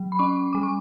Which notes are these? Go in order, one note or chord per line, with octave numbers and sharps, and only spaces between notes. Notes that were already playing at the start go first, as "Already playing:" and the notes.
Already playing: F#3
B5
C#4 C#6
G3 D6
C#6